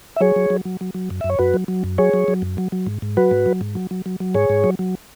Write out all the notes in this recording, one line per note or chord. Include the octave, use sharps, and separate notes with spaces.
E5
F#3 G#4 C#5
F#3
F#3
F#3
F#3
F#3
F#2
F#2 E5
C#5
F#2 F#4 B4
F#3
F#3
F#2
F#3 G#4 C#5
F#3
F#3
F#2
F#3
F#3
G#2
G#2
F#3 F#4 B4
G#2
F#3
G#2
F#3
F#3
F#3
F#3
G#2 G#4 C#5
G#2
F#3
F#3